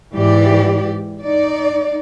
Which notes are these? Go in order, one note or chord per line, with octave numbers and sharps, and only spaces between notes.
G#2 E3 G4 D5
D#4 D5